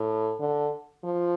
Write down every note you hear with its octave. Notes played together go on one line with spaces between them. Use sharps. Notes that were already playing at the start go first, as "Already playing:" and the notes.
Already playing: A2
D3
F3